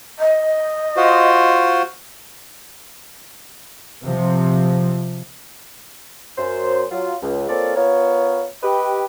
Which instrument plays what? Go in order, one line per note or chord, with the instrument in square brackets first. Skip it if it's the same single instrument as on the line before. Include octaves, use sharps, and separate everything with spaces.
[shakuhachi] D#5
[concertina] F4 F#4 C5
[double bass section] C3 F3
[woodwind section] F#2 C5
F#3 F4
C#2
A#3 C4 F4 A4 C#5 D5
B3 F4 A#4 C#5
G4 B4 D#5